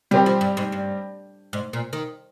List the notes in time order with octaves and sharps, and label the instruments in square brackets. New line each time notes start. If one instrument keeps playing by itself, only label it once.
[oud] C#3 [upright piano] G3 C4 G4
[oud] F3
G2
G#2
G2
G#2
A#2
D#3